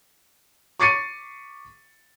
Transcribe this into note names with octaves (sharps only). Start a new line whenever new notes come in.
C#6 D6 A6 C7 C#7 D#7